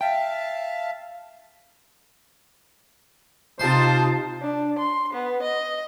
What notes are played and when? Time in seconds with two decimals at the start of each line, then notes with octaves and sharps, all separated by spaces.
0.01 E5 F5 G5 A5
3.59 C3 D#4 F4 C5 A5 C6
4.42 D4
4.79 C6
5.13 B3
5.42 D#5